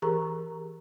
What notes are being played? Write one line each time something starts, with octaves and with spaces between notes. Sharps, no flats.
E3 G4 G#4 A#4 A#5 C#6